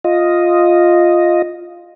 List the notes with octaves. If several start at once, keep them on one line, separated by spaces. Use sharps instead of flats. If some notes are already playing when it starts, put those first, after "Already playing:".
F4 D#5